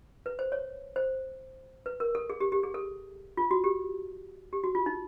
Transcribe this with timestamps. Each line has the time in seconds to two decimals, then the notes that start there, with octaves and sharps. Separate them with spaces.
0.26 B4
0.39 C5
0.52 C#5
0.96 C5
1.86 B4
2.00 A#4
2.15 A4
2.30 G#4
2.40 G4
2.52 G4
2.63 G#4
2.74 A4
3.37 F4
3.51 F#4
3.64 G4
4.53 G4
4.64 F#4
4.75 F4
4.86 D#4